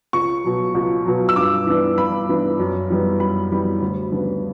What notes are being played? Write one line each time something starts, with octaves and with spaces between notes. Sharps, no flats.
C#2 C#6
B2 F#3
C#2
B2 F#3
E6
G2 D6
E3 B3 D4
G2 B5
E3 B3 D4
F#2
E3 G3 B3
F#2 B5
E3 G3 B3
D2
C#3 G3 B3 D4